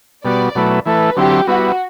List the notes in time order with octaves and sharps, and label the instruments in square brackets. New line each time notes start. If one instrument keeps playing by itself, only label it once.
[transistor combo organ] B2 G3 B3 F#4 [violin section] D5
[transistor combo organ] B2 F#3 A3 E4 B4
[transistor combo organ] E3 A3 E4 A4 [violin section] B4
[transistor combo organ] D3 F#3 C4 E4 [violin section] G4
[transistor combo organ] G3 B3 E4 B4 [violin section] F#4